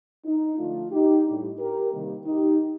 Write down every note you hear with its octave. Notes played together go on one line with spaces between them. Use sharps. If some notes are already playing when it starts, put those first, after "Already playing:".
D#4
D3 F3 A3 D4 F4
D#4 G4
A2 G3 D4
G4 A#4
C3 D#3 G3 A#3 D#4
D#4 G4